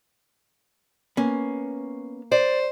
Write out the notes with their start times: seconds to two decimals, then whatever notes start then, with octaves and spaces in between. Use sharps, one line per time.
1.17 A#3 B3 C#4
2.32 C5 D5